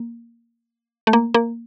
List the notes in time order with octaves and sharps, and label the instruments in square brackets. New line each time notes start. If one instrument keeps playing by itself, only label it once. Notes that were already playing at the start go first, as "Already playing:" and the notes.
Already playing: [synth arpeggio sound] A#3
A3
A#3
A#3